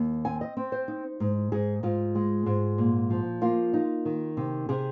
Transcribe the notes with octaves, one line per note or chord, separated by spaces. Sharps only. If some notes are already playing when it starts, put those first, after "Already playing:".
Already playing: D#2
C4 G#5
D#5
C4
C5
D#4
G#2
G#2 G#4
G#2 F4
G#3
G#2
A#2
F3
A#3 F4
D#4
D#3
C3
C3 G#4